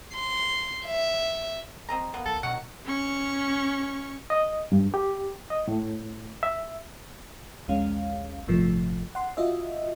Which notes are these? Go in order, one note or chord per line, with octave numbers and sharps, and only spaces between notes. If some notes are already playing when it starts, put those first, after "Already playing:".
C6
E5
C4 D#5 A#5
A#3 B3
B1 A4
B2 D#3 F#3 F#5
C#4 C#6
D#5
G2
G4
D#5
A2
E5
A#1 D#2 G#3 C#4 F5
G1 A2 C3 F3 A3
F#5 C6
F4 F#4 D#5 E5